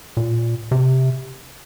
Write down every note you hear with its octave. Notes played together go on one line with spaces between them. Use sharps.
A#2
C3